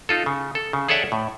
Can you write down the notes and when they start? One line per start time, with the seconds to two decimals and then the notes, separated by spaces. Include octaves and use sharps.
0.09 D#4 F4 A4
0.26 C#3
0.55 A4
0.73 C#3
0.89 G#4 A4 C#5 D5 E5 F#5
1.12 A2